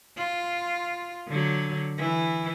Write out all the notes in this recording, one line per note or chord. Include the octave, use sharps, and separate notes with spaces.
F4
D3 F#3
E3